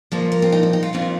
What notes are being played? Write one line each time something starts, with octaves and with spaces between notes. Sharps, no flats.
F2 F3 A#3 C5
A#4
C4
D#4
C4
D#4
F4
F2 D#3 C4 F4